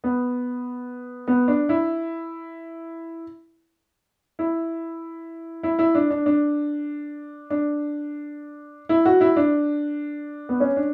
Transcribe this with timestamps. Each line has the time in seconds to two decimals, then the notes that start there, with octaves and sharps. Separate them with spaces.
0.04 B3
1.28 B3
1.48 D4
1.69 E4
4.39 E4
5.63 E4
5.79 E4
5.95 D4
6.10 D4
6.26 D4
7.50 D4
8.89 E4
9.05 F#4
9.21 E4
9.36 D4
10.49 B3
10.60 C#4
10.76 D4